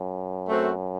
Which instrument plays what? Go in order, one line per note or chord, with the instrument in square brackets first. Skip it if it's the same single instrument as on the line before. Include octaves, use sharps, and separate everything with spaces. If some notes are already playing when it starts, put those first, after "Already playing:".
Already playing: [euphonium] F#2
[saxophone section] A3 C4 F#4 A4 C5